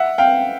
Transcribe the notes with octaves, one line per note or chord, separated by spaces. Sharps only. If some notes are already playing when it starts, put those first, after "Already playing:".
Already playing: E5 F#5
F5 G5